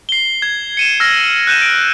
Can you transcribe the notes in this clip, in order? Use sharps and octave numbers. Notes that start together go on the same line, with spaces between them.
C7 G7
G#6
C#7 D#7 E7
E6 F6 G#6 A#6
F#6 G6 D#7 E7
D7